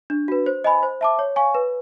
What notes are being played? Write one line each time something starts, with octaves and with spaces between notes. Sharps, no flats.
D4
F#4 B4
C5
D#5 G#5 B5
C5
E5 A5 D6
C#5
F5 G#5 C#6
B4